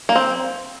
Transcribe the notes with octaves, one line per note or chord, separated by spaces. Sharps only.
A#3
C4